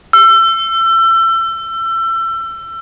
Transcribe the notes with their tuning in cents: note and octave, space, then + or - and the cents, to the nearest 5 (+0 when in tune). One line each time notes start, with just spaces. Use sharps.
E6 +30